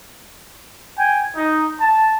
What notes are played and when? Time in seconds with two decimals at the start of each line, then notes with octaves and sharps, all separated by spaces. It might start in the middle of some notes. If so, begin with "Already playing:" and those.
0.99 G5 G#5
1.36 D#4
1.80 A5